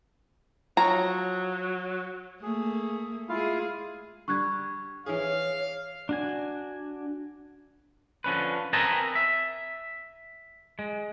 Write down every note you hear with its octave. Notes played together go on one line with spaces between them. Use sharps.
F3 F#3 C#5 A#5
A3 A#3 G#4
G#3 E4 F4 G#4 F5
D3 G3 C#6 F#6 G#6
E3 G#4 C#5 F5
D4 F#4 G#5
D3 F3 C#4 B4
C4 A#4 B4 D#5 G#5 A5
E5
G#3